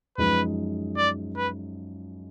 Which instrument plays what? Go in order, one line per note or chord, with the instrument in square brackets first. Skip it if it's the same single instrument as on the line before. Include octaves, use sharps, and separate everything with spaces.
[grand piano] F#2 F3 G#3 D#4 [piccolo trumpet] B4
[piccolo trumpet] D5
B4